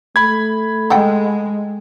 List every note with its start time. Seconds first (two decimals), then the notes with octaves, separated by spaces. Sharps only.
0.16 A3 B5 G#6
0.90 G#3 A4 F#5 G5